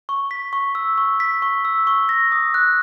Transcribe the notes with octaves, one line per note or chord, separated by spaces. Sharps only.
C#6
B6
C#6
E6
C#6
B6
C#6
E6
C#6
A#6
D#6
F#6